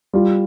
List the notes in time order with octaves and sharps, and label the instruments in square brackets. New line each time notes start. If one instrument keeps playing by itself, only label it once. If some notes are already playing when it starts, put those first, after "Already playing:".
[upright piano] G3 F4